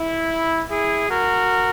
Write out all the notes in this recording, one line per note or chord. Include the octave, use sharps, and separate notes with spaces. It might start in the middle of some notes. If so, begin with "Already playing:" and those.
Already playing: E4
E4 G#4
F#4 A#4